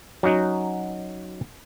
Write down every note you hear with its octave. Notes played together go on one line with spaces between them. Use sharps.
F#3 C#4 D#4 F#4